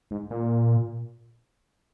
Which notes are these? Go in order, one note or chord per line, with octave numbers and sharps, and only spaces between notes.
G#2
A#2